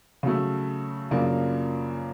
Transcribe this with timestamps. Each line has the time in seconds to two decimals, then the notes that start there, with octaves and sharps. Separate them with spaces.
0.23 C#3 F#3 A3
1.11 F#2 C#3 F3 A#3 D4